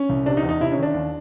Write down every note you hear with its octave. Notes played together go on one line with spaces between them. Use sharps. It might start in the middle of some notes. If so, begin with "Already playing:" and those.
Already playing: C#4
C2
C3 D4
D#4
E2
D#4
C3 E4
C#4
D#3
D4
D#2